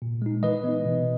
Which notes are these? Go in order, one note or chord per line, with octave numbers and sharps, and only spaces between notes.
A#2
G#3 D#4
E3 B4 D#5
B3 D#4
B2